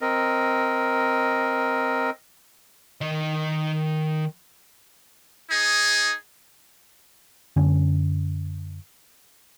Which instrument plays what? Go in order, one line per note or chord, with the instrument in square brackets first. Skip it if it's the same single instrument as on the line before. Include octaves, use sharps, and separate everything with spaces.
[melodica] C4 A#4 D#5
[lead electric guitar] D#3 D#5
[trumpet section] D#4 G#4
[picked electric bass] F#2 D3 C#4